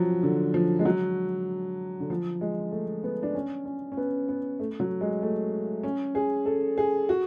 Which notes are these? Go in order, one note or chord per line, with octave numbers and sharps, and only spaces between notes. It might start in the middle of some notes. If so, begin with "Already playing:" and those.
Already playing: F3 F#3
D3
F3
G#3
F#3
D3
F3
G#3
A3
B3
D4
C#4
C#4
C#4
B3
B3
A3
F#3
G#3
A3
C#4
G#4
A4
G#4
F#4